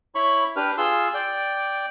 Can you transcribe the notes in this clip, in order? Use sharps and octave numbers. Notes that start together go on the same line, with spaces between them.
E4 C#5 B5 C#6
D4 G4 B4 F6
F4 G#4 C6 E6
D5 G5